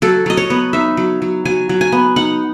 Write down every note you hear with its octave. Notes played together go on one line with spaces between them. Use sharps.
F#3 A4
F#3 D#5
C#5
B3
D#4 E5
F#3
F#3
F#3 G#5
F#3
G#5
B3
D#4 F#5